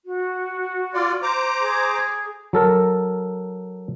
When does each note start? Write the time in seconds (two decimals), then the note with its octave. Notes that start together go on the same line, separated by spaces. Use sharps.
0.05 F#4
0.94 F4 D5
1.22 C5 A#5 D6
1.60 G#4
2.53 F#3 A4 A#4